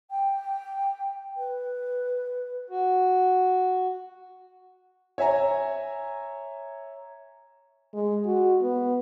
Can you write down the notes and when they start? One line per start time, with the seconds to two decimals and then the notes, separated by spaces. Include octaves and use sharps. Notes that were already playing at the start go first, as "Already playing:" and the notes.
0.10 G5
1.37 B4
2.69 F#4
5.18 C#5 E5 G#5 A#5
7.94 G#3
8.25 F#4
8.61 B3